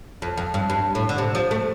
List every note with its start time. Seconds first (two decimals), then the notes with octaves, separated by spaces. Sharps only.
0.22 F2
0.37 F2
0.54 G2
0.70 G2
0.95 A2
1.09 D3
1.18 C3
1.35 F3
1.51 A3